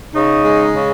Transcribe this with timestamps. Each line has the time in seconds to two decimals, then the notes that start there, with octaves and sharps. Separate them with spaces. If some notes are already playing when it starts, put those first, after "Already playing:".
0.14 C#3 D#4
0.44 G#3
0.74 C#3